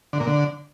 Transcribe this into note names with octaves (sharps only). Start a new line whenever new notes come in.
D3
A#2
D3